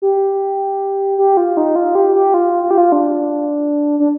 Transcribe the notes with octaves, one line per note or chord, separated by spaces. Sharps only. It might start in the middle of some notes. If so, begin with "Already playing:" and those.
G4
G4
F4
D#4
F4
G4
G4
F4
F4
G4
F4
D4
D4